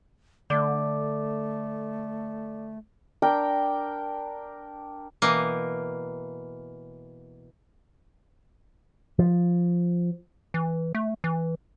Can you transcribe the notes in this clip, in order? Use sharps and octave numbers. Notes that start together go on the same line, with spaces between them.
D3 A3 D5 D6
D4 A#4 G5
B2 E3 A#3
F3
E3
A3
E3